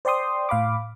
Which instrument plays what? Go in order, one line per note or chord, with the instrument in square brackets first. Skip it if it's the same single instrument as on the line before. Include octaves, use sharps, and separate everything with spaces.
[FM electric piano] C5 D5 G5 C6 D#6
A2 F5 B5 D6